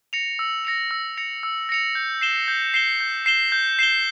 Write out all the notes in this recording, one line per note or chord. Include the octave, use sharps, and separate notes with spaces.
A#6 C#7 F7
E6
A#6 C#7 F7
E6
A#6 C#7 F7
E6
A#6 C#7 F7
G6
C7 E7 G7
G6
C7 E7 G7
G6
C7 E7 G7
G6
C7 E7 G7